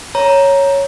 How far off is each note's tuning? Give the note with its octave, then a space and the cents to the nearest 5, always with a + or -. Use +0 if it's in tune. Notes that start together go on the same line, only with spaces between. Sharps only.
C#5 +0 A#5 +5